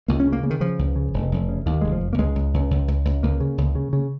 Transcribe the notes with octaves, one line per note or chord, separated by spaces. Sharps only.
C#2 A#3
C#4
C#3
A#3
C#3
D#3
C#3 F3
C#2
C#3
F1
F1
C#3
D#2 D#3
F1 G#3
F3
F1
A#3
C#2 G#3
C#2
C#2
C#2
C#2
C#2
C#2 A#3
C#3
C#2
C#3
C#3